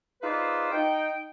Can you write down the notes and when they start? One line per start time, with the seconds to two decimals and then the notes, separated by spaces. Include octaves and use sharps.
0.22 D#4 F4 G#4 B4 C5 D5
0.72 D#4 G5